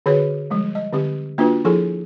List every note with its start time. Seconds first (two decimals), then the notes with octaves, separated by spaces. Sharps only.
0.06 D3 F#4 G#4 B4 C#5
0.50 F3 G3 G#3
0.75 D#5
0.93 D3 C4 G4
1.38 A#3 D4 F4 F#4 B4
1.65 F3 E4 G#4 A4 G#5